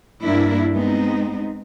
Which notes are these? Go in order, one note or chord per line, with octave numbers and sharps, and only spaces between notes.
G2 A#3 D4 E4 A#4
G#3 B3 C4 D#4